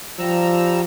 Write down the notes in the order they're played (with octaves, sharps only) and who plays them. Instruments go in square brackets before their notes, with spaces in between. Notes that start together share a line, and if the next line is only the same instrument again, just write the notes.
[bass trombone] F3 [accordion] G3 A#5 E6